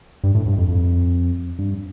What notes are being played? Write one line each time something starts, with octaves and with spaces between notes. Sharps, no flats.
G2
A2
G2
F2
F2
G2